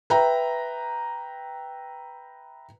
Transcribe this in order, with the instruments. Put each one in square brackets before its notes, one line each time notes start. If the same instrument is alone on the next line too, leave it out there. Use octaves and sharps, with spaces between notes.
[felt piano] B4 E5 G5 A#5